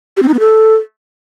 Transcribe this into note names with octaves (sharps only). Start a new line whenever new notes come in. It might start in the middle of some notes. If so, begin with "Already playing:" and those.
G4
C4
D#4
B3
A4